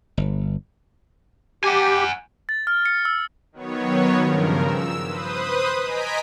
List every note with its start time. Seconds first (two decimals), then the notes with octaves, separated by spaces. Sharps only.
0.17 G1
1.64 G4 F#5 G#5
2.49 A6
2.67 F6
2.86 C#7
3.05 E6
3.52 D#3 F#3 B3 C#5
4.18 G2 C#3 F3 A#4
4.63 E6
5.05 B4 C5 D#6
5.82 D#5 G#5 A#5 B6 D7